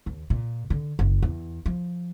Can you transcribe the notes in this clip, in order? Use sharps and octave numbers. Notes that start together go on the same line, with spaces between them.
D#2
A#2
D3
F#1
E2
F3